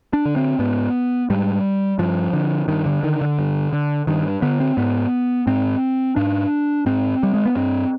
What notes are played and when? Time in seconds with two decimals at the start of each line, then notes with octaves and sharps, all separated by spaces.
0.13 D4
0.25 D3
0.36 C4
0.59 G#2 B3
1.30 G#2 G3
1.99 G2 F3
2.33 D3
2.68 G2 D#3
2.86 D3
3.03 D3 D#3
3.21 D3
3.39 G2
3.73 D3
4.07 G2 D#3
4.42 D3 B3
4.60 C4
4.77 G#2 B3
5.47 G#2 C4
6.16 G#2 D4
6.86 G#2 C4
7.23 G3
7.34 G#3
7.46 B3
7.56 G2 C4